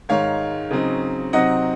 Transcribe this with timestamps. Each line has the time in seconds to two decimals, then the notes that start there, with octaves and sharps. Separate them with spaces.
0.09 G#2 D#3 G#3 C#5 F5
0.71 C#3 F#3 C4 D#4
1.33 C3 F#3 C4 D#4 D#5 F#5